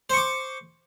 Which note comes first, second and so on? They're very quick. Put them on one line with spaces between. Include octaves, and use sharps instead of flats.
C5 C#6 D6